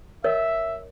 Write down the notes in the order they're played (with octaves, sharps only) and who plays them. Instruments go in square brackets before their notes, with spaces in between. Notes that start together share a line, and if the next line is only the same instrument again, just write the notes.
[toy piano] A#4 C#5 D#5 [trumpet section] E5